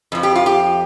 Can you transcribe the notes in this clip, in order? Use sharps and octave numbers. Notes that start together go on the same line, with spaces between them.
F2 F3
G4
F4
G4